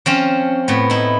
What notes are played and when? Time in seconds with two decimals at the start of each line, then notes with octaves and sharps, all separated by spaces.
0.06 F3 C4 C#4
0.68 A2 B3
0.90 D#4 E4